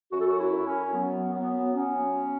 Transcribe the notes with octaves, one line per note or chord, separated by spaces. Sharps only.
F#2 F#4
A4
F#4
E4
F#2
C#4
F#3 B3
F#3 B3
F#3 C#4